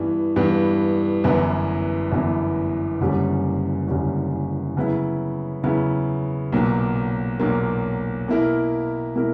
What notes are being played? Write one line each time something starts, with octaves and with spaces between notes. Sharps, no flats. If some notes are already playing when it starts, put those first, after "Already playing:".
Already playing: G2 E3 B3
G2 E3 B3
G1 F#2 E3 B3 E4
G1 F#2 E3 B3 E4
F#1 F#2 D3 G3 C#4
F#1 F#2 D3 G3 C#4
C#3 F#3 B3 E4
C#3 F#3 B3 E4
B1 A#2 F#3 A#3
B1 A#2 F#3 A#3
B2 A#3 E4 A#4
B2 A#3 E4 A#4